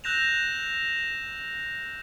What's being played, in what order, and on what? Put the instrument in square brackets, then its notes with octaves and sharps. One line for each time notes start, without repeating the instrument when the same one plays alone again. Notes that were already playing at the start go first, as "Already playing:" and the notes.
[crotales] E6 F#6 G6 A#6 E7 F7